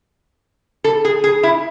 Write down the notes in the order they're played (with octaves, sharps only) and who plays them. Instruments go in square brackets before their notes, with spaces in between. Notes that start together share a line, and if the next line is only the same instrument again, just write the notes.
[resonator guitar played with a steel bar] A4
G#4
G#4
E4